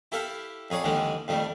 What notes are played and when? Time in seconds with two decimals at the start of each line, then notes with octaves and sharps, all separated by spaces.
0.12 E4 G4 A4 E5 F5
0.70 F2 G#4 C#5 D5
0.84 D#2 D3 E3 G3 G#3
1.28 F2 D#3 G3 A3